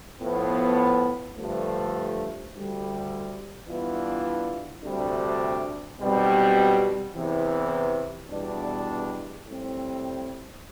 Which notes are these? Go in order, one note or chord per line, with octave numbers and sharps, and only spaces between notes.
A2 F3 B3
G2 D3 F3 A3
D2 D3 G3
G2 E3 B3 D4 F4
D2 C3 G3 D4
B1 B2 G3 C4
E2 C3 E3
E2 B2 G3 D4
A2 G3 C4